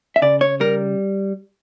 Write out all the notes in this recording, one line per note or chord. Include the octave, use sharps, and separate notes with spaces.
E5
C#3 D5
C#5
G3 A#4